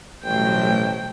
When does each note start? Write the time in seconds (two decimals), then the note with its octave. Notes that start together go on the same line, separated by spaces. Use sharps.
0.24 A1 B2 F#3 G3 A3 C5 G5